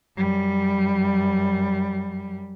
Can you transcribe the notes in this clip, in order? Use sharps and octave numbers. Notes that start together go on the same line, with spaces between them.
F#2 G3